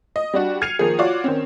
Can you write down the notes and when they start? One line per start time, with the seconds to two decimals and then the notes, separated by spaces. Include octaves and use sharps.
0.16 D#5
0.34 G3 D4 F#4
0.61 F6 G#6 C7 C#7 D#7 F7
0.79 D#3 F3 A#3 G#4
0.99 F4 F#4 C#5 D5 D6
1.24 D#3 C4 C#4